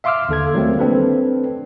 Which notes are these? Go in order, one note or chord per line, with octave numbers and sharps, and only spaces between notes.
E5 F5 C6 D6 E6 F6
D#2 D3 A4 G#6
D#3 F#3 G3 A3 A#3 C4
C4 D4 A4 B4